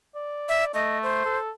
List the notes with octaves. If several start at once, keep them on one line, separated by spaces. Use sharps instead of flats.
D5
E5
A3 D#5
C5
A4